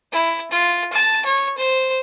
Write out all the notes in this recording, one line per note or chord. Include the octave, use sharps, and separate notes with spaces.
E4
F4
A5
C#5
C5